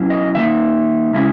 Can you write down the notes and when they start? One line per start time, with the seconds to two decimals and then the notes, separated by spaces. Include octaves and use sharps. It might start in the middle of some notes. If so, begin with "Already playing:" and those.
Already playing: B2 F#3 C#4 E4
0.10 D#5
0.35 D#3 A#3 D#4 E5
1.13 C#3 G#3 C#4 E4